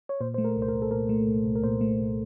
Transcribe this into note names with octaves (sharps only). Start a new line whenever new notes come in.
C#5
A#2 C5
A3 C5
A#4
C2
C5
A#4
C2
A4
A#2 A#4
A3
C2
C2
A#4
A#2 C5
A3
C2